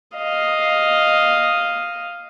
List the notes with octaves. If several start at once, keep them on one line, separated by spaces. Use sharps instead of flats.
D#5 F5